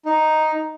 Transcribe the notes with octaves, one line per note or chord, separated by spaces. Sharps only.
D#4